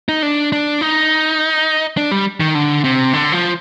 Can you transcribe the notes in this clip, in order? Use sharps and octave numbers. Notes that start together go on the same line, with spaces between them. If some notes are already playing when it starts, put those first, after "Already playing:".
D#4
D4
D4
D#4
D4
G3
D#3
D3
C3
D3
F3